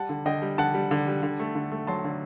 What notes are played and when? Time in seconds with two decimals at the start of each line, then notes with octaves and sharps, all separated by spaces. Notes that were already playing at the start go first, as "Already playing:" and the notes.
Already playing: G3 F#5 A5
0.09 D3
0.26 D3 D#5 G5
0.42 G3
0.58 D3 F#5 A5
0.74 G3
0.91 D3
1.07 G3
1.23 D3
1.39 A3
1.55 D3
1.72 A3
1.87 F#3 A5 C6
2.04 D3